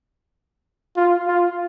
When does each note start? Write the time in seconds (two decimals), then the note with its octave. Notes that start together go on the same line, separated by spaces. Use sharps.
0.97 F4
1.28 F4